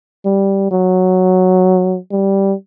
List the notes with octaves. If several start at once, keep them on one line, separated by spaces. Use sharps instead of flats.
G3
F#3
G3